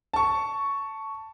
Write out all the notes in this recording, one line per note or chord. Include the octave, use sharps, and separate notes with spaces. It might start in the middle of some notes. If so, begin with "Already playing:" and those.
A5 C#6